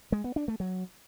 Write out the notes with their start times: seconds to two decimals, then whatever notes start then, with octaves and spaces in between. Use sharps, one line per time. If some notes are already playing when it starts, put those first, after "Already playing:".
0.12 G#3
0.24 B3
0.36 D4
0.48 A3
0.60 F#3